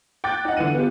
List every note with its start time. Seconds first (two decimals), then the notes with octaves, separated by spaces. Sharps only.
0.24 G5 D6 F#6 A6
0.45 D#4 F#5
0.57 D3 E3 F#5 D#7
0.75 B3 F4 G4